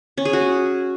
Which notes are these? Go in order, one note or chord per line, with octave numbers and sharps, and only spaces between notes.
C#4
G#4
F#4